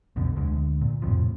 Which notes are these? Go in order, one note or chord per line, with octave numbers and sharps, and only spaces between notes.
B1 F2 B2 D3
D2 D3 G#3
A#2
F2 A2 C3 F3